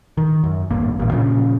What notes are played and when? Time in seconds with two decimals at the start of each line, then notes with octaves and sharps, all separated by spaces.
0.17 D#3
0.44 F#2
0.70 D1 G#1 G2 A#3
0.99 A1 G2 A#2
1.11 A#2 C#3 F3